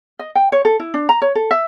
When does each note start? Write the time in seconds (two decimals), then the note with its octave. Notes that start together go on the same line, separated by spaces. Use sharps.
0.19 D#5
0.35 G5
0.52 C#5
0.65 A4
0.80 E4
0.94 D4
1.09 A#5
1.22 C#5
1.35 A4
1.51 E5